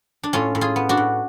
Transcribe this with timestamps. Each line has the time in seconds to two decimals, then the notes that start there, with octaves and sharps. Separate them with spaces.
0.23 D4
0.33 A2 C#4 F4
0.55 A2
0.61 F4 G#4
0.76 B3
0.89 D4 F#4
0.97 A2